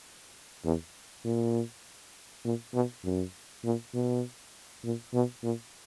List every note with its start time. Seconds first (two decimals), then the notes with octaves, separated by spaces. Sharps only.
0.65 E2
1.24 A#2
2.44 A#2
2.74 B2
3.04 F#2
3.64 A#2
3.94 B2
4.84 A#2
5.14 B2
5.43 A#2